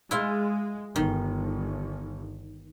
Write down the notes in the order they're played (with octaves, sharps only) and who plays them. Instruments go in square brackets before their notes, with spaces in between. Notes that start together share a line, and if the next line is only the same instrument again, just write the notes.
[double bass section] G#3 [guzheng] E4 F4
[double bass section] G1 [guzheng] D#3